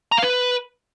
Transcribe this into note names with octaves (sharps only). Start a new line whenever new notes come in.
A#5
F5
B4